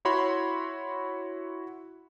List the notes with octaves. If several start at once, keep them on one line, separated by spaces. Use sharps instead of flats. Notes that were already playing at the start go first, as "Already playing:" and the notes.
E4 F#4 C#5 B5 C6